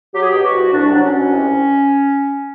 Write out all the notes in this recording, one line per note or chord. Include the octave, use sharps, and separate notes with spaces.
F#3 G4
G#4
G4
B2
F#4
C2
C2 D4
F#3 D4
C#4
B2
C2